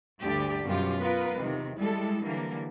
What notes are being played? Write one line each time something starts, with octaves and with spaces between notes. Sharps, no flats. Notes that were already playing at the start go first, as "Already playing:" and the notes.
D2 G2 D3 G4 D5
F#2 B2 F#3 G3 F4 G4
B3 F4 A#4 B4
E2 C3 D#3
G3 G#3 E4 A4
D3 E3 F#3 G3 A#3